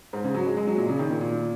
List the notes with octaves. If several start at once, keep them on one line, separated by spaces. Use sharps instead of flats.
G#2
C#3
F#3
G#3
G#3
F#3
A#2
C#3
D#3
A#2
A#2